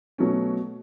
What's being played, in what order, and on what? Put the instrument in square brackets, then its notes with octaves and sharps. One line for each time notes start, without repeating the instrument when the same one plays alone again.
[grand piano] B2 F#3 A3 C#4